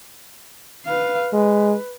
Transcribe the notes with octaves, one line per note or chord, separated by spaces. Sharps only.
B4 F5
G#3 B4